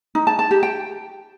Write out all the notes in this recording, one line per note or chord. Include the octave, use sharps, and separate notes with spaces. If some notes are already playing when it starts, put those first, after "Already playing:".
D#4
A5
A5
G4
G5